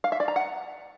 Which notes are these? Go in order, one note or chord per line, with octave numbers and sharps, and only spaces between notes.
F5
E5
D5
A#5
F#5